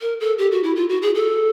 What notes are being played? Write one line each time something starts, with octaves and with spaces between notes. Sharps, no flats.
A#4
A4
G4
F#4
E4
F4
F#4
G#4
A4